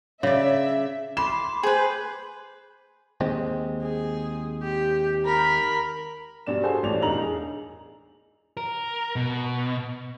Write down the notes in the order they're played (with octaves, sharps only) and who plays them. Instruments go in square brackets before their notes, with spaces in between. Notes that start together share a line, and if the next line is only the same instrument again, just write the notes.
[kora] C#3 D5 [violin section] E5
[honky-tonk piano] B5 E7 [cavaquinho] C6 [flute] D6
[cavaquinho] G#4 B4 [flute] C5
[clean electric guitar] D#2 G#3 C4
[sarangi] G#4
G4
[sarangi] A#4 [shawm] B5
[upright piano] G2 B2 D5 E7
F#4 G#4 A4 C5 G#5 A5
A1 G2 D5 F7
E1 D4 D#4 A#5 F7 F#7
G#4
[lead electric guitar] A#4
B2